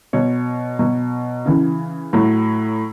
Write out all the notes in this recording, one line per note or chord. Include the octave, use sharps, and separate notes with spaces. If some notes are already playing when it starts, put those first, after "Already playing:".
B2 F#3 C#5
B2 F#3
C#3 E3
A2 F#3